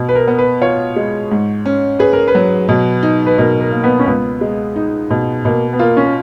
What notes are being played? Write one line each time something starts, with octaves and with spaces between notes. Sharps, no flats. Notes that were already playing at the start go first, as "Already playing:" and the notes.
Already playing: B2
B4
A#4
B3
B4
F4 C#5
G#3
G#2
C#4
G#4 B4
A#4
B4
F#3
B2
D#4
B4
B2 A#4
A#4
A#3
B3
C#4
C#2 B3
G#3
D#4
B2
B2 A#3
B3
A#3 F4
C#4